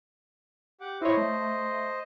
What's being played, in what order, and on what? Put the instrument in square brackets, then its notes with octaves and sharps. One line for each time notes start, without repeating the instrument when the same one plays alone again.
[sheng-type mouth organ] G4 F#5 D6
[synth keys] E4 C#5 [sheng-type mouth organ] C5 D#5
[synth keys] A3